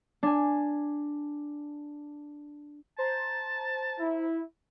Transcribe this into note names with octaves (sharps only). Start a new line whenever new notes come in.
D4 G#5
C5 A5 A#5
E4